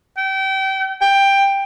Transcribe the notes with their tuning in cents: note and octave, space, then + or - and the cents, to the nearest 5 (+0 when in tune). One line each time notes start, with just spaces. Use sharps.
G5 -30
G5 +10